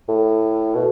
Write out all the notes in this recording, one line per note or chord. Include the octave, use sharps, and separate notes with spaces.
A2
B2